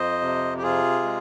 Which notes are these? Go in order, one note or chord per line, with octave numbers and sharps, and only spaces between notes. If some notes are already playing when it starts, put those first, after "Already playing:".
Already playing: F2 C5 D#5
C3
G4
C3 F4 G#4
G#3